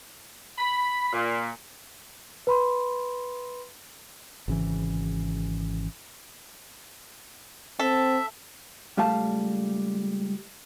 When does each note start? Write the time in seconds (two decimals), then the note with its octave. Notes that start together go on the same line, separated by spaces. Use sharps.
0.58 B5
1.13 A#2
2.47 B4 B5 C6
4.48 G#1 C#3 E3
7.79 C4 A4 E5
8.97 C#2 G3 A3 F5 A5